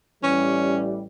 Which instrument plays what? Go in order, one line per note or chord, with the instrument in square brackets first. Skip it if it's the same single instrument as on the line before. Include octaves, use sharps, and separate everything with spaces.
[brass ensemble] A1 E3 G3 [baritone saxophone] C#4